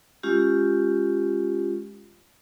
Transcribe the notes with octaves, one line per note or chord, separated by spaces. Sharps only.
G#3 C#4 F4 G4